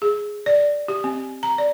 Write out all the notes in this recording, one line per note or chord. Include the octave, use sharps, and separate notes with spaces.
G#4
D5
G4
C4
A#5
D5